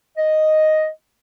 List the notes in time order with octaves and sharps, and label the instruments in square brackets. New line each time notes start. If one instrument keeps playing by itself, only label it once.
[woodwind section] D#5